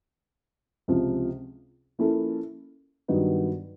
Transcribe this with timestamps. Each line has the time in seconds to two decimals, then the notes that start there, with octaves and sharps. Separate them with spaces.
0.88 C#2 C3 F3
1.99 F3 A#3 C#4 E4 A4
3.08 G2 D#3 F#3 B3 D#4